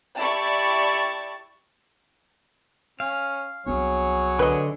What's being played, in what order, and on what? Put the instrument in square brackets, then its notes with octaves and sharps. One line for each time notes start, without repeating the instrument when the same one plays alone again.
[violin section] E4 G4 D5 A5 C#6
[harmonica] C#4 [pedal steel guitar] F5
[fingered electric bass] C2 B3 D4 [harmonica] F#3 G#4 C#5
[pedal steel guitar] D3 [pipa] B4 D#5